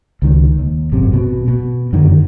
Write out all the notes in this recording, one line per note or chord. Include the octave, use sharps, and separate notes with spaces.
C#2 D#3
D#2
G#1 F#2 C3
B2
B2
F#2 D3 D#3 F#3